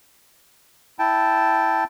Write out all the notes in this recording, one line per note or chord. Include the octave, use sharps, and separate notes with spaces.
E4 G5 A5